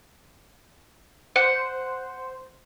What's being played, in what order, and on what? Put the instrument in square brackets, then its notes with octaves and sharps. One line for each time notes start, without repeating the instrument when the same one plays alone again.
[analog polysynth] C5 [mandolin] F#5